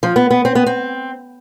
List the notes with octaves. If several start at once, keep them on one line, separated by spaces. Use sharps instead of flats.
F3
B3
B3
C4
B3
C4